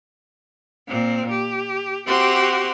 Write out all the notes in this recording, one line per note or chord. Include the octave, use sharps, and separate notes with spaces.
A#2 C4
G4
C4 F#4 G4 E5 C6